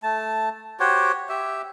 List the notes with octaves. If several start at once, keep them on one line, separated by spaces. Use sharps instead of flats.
A3 A5
F#4 G4 C5 C#5
G4 E5